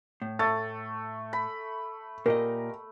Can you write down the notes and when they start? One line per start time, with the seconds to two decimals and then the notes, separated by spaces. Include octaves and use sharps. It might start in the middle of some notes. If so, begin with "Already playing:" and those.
0.22 A2
0.39 A3 A6
1.33 B5
2.26 A#2 G4 A#4 D#5